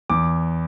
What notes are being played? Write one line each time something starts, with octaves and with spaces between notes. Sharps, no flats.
E2 D6